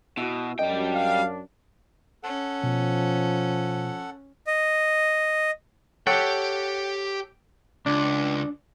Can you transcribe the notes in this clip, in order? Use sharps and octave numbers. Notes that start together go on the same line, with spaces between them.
B2 E4 F#4
F#2 G3 D4 D#5 G5
F5
C#4 A4 F#5
B2 F3
D#5
G4 A4 C#5 F#5 G5
C#2 D4